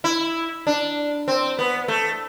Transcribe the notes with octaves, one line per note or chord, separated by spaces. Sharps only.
E4
D4
C4
B3
A3